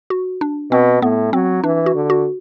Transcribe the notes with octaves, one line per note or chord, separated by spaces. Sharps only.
F#4
D4
B2 C4
A2 B3
F#3 C4
E3 D4
F#4
D3
F#4